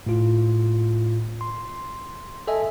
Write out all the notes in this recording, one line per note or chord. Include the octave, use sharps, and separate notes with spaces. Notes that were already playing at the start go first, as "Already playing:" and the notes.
A2 F4
C6
A4 D#5 E5 G#5